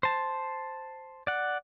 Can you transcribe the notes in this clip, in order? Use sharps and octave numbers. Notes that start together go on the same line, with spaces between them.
C5 A5
D5 F#5